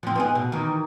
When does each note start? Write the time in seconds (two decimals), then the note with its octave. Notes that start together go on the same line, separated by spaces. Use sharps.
0.03 F3 C4
0.15 B3 D#4 G#4
0.35 B2
0.52 D#3 E3